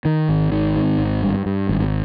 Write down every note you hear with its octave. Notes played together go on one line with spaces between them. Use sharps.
D#3
G#1
D#3
G#2
G#1
G2
G2
G#1